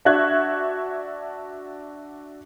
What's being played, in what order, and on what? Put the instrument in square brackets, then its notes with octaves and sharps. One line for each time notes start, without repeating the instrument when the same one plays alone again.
[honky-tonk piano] D4 F#4 E5 C#6 F#6 G#6